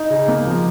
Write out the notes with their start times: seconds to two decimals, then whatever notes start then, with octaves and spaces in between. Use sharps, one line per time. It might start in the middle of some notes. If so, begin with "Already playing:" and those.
Already playing: D#4
0.10 C#3
0.28 A#3
0.47 F3